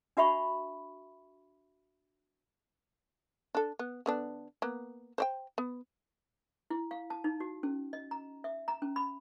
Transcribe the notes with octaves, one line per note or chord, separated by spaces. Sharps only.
D4 F#4 E5 B5 C#6
D4 A4
B3
D3 B3 D4
A#3 B3
C5 D5 G5
B3
E4
F5
A5
D#4
F#4
C#4
D#5
A#5
E5
A#5
C#4
B5